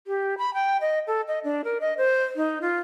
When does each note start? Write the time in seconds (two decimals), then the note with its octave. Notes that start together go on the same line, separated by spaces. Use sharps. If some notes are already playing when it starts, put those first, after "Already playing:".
0.07 G4
0.38 B5
0.54 G5
0.81 D#5
1.07 A4
1.28 D#5
1.44 D4
1.64 A#4
1.81 D#5
1.98 C5
2.36 D#4
2.62 F4